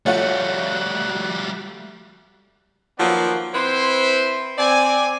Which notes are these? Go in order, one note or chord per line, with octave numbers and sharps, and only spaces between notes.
G3 A3 F4 F#4 C#5 F#5 F#6
D#3 F3 F#3 A#3 B3 D5
C4 E4 B4 C5
C4 D5 G#5